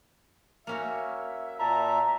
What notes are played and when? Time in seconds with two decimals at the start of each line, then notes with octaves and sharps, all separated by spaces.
0.67 A#3 C#4 F#4 E5
1.59 A#2 E5 A5 A#5